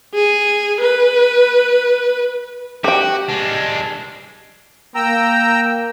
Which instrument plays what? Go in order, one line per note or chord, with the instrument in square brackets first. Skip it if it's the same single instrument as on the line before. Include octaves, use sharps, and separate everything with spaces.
[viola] G#4
B4
[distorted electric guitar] F#4 [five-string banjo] G4 G5
[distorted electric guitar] G#3 D4
[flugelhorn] A#3 [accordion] G5 A#5 E6